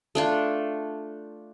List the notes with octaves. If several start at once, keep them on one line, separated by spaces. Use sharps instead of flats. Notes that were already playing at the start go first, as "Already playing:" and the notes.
A3 D4 F4